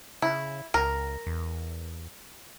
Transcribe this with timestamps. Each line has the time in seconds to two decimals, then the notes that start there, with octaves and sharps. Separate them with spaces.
0.22 C#3 E4
0.74 C#2 A#4
1.27 E2